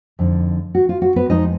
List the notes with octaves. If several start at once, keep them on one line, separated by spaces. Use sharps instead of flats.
F2 D3 G#3 D#4
F#4
F4
F#4
B3 B4
F2 F3 G#3 D#4 D#5